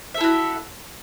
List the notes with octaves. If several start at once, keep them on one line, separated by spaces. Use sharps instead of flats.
E4 F#4 A4 E5